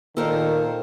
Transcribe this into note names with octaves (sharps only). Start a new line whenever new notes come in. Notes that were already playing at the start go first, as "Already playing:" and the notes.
A#2 D#3 A4 A#4 C5